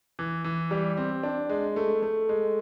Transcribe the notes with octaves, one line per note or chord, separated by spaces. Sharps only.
E3
E3
G3
C4
D4
G#3
A3
A3
G#3